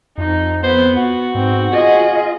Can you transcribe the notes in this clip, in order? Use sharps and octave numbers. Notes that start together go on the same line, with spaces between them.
F2 D#4
B3 C5
F#4
G#2 C4
F4 G#4 D#5